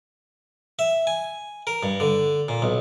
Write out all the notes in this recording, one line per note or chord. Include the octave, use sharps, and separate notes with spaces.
E5
G#5
A#4
G2
D3
A#2
B1